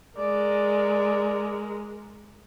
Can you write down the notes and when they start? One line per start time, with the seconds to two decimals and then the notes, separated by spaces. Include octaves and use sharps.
0.18 G#3 A#4 D5